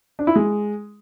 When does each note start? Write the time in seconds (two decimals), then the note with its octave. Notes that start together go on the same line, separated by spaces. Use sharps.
0.19 D4
0.27 E4
0.35 G#3